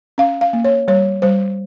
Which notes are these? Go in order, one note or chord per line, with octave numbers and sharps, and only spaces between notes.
C#4 F5
F5
A#3
C#5
G3 C#5
G3 C5